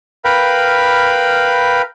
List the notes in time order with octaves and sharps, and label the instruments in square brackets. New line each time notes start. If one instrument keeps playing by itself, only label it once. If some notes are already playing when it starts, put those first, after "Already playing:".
[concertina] A#4 B4 F5 G5 B5